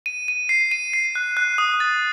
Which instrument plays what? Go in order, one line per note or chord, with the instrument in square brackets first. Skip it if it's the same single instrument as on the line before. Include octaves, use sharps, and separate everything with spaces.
[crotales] D#7
D#7
C7
D#7
C7
F#6
F#6
D#6
A6